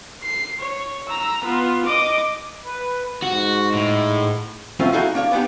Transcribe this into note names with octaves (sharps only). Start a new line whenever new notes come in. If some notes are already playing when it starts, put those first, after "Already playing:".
C7
C#5
A#5 E6
B3 F4
D#5 D6
B4
G#2 F#4
A2
F#3 A3 C4 C#4 F4
D#4 E4 F#4 G#4 A4 F5
A#3 D4 C#5
B3 D4 D#4 G4